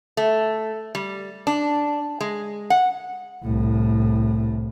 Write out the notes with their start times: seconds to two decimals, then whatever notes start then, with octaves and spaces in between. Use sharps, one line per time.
0.17 A3
0.95 G3
1.47 D4
2.21 G#3
2.70 F#5
3.44 C2 A2